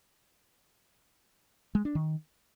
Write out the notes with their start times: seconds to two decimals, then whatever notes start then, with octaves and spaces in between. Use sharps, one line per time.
1.75 G#3
1.85 D4
1.95 D#3